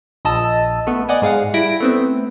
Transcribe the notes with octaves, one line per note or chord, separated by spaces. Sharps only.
A#1 D#5 A5 E6
A3 B3
D5 D#5 F#5 G#5
G#2 G#4 F5 F#5
G3 E4 A#6 D7
A3 B3 C4